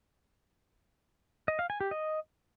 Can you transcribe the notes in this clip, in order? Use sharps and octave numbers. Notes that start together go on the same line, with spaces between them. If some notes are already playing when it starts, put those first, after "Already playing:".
D#5
F5
G#5
G4
D#5